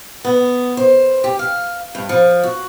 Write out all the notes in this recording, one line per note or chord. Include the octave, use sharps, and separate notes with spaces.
B3
C5
G4
F5
G2
F3
F#4